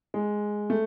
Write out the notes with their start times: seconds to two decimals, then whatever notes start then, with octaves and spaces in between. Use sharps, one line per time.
0.14 G#3
0.70 A3